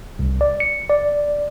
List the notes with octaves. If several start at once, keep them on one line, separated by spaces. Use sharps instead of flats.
C2
D5
C#7
D5